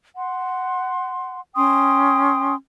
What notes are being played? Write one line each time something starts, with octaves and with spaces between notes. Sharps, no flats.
F#5 C6
C#4 G5 C6 D#6